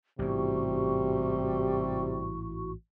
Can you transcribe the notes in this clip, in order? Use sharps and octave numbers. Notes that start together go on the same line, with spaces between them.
A1 G#2 C3 G3 E4 F#4 C#6